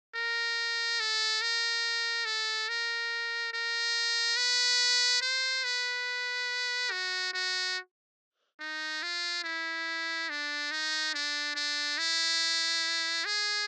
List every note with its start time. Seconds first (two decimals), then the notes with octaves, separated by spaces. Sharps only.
0.15 A#4
1.00 A4
1.42 A#4
2.25 A4
2.69 A#4
3.53 A#4
4.37 B4
5.22 C5
5.64 B4
6.91 F#4
7.33 F#4
8.60 D#4
9.03 F4
9.44 E4
10.30 D4
10.71 D#4
11.14 D4
11.55 D4
11.98 E4
13.25 G#4